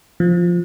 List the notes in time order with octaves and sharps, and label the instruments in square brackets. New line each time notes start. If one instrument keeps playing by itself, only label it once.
[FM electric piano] F3